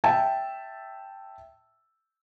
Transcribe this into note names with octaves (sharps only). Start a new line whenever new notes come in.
E5 G5 A5